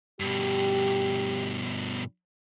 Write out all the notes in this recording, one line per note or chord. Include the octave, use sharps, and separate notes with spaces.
G2 B2 G4